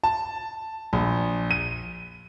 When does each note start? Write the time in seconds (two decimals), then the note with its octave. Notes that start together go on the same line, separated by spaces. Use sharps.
0.04 A5
0.93 A#1
1.51 D#7